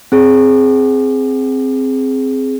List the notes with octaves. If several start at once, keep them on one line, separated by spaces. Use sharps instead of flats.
C4 G#4